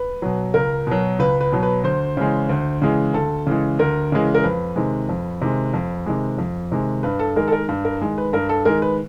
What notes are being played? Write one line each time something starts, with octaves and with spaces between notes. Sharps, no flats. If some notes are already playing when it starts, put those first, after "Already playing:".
Already playing: B4
B2 F#3
C#2 A#4
B2 F#3
C#2 B4
B4
B2 F#3
B4
D2 C5
C#3 E3 G#3
D2
C#3 E3 G#3
D2 A4
C#3 E3 G#3
D2 A#4
C#3 E3 G#3
A#4
F2 B4
C3 D#3 G#3
F2
C3 D#3 G#3
F2
C3 D#3 G#3
F2
C3 D#3 G#3
G2 B4
A4
D#3 G#3 A#4
A4
A#4
G2
A#4
D#3 G#3
B4
G2 A#4
A4
D#3 G#3 A#4
B4